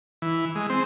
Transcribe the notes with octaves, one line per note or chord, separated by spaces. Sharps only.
E3
G#3
C4